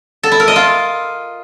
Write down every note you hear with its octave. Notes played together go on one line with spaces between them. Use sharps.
A4
E4
A#4
D#5
F4